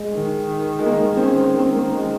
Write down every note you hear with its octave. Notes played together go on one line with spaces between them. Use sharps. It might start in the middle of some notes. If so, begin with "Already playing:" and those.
Already playing: G#3
D#3
G#3
A#3
C4
C#4
C4
A#3
G#3